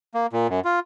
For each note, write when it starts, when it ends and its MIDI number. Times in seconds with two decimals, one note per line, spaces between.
0.14 0.26 58
0.33 0.47 46
0.49 0.60 42
0.65 0.80 65